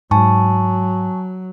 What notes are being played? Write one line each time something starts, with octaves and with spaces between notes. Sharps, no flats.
G#2 F#3 G#5 A5 C#6